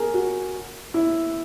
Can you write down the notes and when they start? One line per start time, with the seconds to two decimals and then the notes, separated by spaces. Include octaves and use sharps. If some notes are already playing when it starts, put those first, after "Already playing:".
Already playing: G#4 A#4
0.14 F#4
0.94 E4